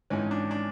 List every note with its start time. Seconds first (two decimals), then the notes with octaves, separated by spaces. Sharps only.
0.10 G#1 G#2 E3 C#4 D#4
0.31 D4
0.51 D4